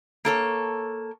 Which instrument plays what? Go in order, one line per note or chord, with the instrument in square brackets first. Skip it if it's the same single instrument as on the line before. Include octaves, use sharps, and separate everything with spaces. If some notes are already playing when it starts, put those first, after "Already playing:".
[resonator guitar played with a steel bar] A#3 A4 C#5